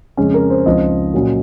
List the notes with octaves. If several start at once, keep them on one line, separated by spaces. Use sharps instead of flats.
F2 C#3 G#3 C#4 G#4
A#4
C5
C#2 C#3 F3 C4 D#4 D#5
A#2 F#3 C#4